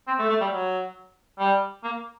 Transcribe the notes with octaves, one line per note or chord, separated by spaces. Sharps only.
C4
A3
A3
G3
F#3
G3
A#3